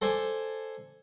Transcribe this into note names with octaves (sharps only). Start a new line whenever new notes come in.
A4 C5 D5 G#5 A5